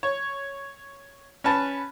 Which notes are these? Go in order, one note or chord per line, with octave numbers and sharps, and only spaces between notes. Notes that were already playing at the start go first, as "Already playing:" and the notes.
C#5
C#4 B4 A5